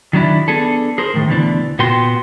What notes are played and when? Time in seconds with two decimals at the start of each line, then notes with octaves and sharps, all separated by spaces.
0.13 D#3 F#3 D4 E4
0.48 B3 D4 G#4 A4
0.98 G#4 A#4 C5
1.14 A2 D#3
1.27 D2 B2 D3 E3 D4
1.79 A#2 B3 F#4 G5 C6